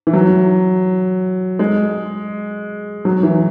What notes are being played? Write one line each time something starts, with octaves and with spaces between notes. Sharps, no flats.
E3
F#3
G#3
F#3
E3